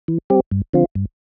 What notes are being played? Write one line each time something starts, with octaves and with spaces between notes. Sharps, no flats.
E3
G3 C4 G4
G2
D3 F3 C4 F4
G2